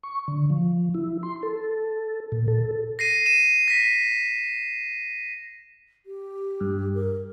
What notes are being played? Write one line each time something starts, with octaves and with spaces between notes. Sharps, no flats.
C#6
D3
F3
E4
C6
A4
A#2
A4
A#6 C7 D#7
D#7 E7
A#6 B6
G4
G2
A#4